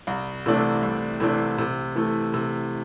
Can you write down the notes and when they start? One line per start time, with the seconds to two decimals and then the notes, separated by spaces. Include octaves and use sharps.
0.07 C2
0.46 C3 E3 A3 D4
0.82 C2
1.20 C3 E3 A3 D4
1.58 C3
1.96 E3 A3
2.34 C3